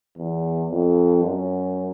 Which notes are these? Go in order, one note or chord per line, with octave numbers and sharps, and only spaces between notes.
E2
F2
F#2